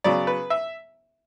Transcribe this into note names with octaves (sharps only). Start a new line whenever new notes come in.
C#3 F#3 B3 D5
B4
E5